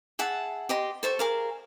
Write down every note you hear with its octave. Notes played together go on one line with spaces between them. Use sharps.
G#4 E5 F#5 A5
G4 D#5 C6
A4 C5 C#6
G#4 A#4 F5